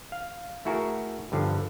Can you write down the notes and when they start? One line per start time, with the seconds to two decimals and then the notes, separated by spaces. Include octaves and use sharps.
0.12 F5
0.65 A3 E4 F#4 G#4 A#4
1.32 G2 D3 F3